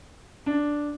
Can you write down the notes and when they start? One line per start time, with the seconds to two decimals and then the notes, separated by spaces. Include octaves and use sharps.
0.46 D4